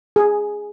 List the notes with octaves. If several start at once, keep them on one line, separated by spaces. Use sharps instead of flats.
G#4